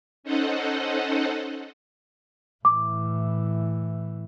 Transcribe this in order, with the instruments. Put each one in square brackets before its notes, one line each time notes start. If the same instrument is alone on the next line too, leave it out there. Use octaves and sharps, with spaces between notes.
[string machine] C#4 D#4 A4 C5 D#5 F#5
[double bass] A2 E3 [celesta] D6